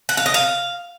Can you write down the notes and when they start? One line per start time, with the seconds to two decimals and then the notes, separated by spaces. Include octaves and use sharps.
0.09 F#5
0.17 F5
0.26 D#5
0.34 F5